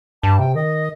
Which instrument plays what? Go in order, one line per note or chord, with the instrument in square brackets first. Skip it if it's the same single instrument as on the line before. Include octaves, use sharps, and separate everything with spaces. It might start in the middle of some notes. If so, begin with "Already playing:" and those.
[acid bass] G2 [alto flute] A5
[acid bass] C3 [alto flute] G5
[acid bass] D#3 [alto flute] D#5